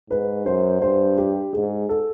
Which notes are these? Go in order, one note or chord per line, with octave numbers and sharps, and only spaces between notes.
G#2 B4
F#2 C5
G2 C5
G4
G#2 G#4
A4